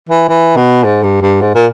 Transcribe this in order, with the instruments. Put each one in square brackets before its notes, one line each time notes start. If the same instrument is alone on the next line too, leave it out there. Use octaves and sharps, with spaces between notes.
[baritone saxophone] E3
E3
B2
G#2
G2
G2
G#2
A#2